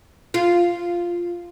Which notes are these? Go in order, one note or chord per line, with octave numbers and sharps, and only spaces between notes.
F4